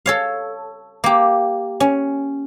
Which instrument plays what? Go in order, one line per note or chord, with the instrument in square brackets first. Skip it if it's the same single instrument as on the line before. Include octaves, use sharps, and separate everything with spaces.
[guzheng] A4 C#5 F5
A#3 G4
C#4